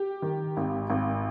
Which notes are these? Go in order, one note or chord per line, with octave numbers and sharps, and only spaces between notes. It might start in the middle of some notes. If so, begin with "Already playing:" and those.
Already playing: G4
D#3
G#1
G#1